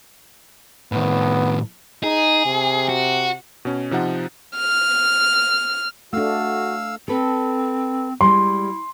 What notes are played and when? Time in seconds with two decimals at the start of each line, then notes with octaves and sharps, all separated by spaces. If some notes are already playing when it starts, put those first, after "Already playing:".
0.92 A2 D#3 B3
2.04 D#4 G#4
2.46 C3
2.89 F#4
3.65 B2 C#4
3.91 C3 F3 D#4 F#5
4.57 F6
6.13 A3 D4 F#4 F5 E6
7.08 C4 A4 B4
8.21 G3 G#3 E4 C6